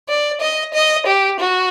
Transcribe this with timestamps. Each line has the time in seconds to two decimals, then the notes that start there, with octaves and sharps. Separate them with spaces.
0.09 D5
0.41 D#5
0.74 D#5
1.07 G4
1.39 F#4